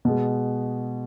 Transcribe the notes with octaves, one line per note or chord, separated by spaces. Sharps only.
B2 G#3